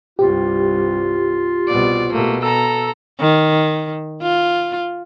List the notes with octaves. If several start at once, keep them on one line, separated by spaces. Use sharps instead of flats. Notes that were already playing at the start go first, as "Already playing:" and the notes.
C2 G2 F4 G4
C2 B2 D5
B2 A3 A#3
A4 A#5 E6
D#3
F4